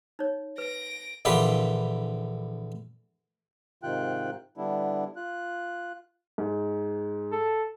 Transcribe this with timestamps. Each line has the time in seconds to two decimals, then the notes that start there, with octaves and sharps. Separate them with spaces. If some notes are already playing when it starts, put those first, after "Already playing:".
0.19 D#4 C#5
0.58 B4 A#6 D7
1.25 A#1 D3 E3 F4 G4 B4
3.83 G#2 C3 D#3 F4 G5 F#6
4.57 D3 G3 B3 D4 E4
5.16 F4 F#6
6.38 G#2
7.32 A4